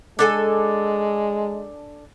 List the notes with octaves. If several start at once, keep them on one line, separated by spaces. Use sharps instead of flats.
G#3 D4 A4 G#5